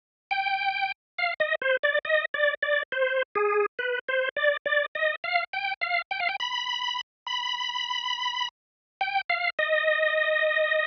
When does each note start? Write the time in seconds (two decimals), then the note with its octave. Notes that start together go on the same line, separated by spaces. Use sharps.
0.31 G5
1.18 F5
1.40 D#5
1.62 C5
1.83 D5
2.05 D#5
2.34 D5
2.63 D5
2.92 C5
3.35 G#4
3.79 B4
4.08 C5
4.37 D5
4.66 D5
4.95 D#5
5.24 F5
5.53 G5
5.81 F5
6.11 G5
6.20 F5
6.29 G5
6.40 B5
7.27 B5
9.01 G5
9.30 F5
9.59 D#5